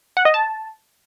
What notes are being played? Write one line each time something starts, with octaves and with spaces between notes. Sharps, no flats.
F#5
D#5
A5